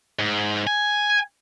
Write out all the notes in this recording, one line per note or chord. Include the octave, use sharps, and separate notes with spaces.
G#2
G#5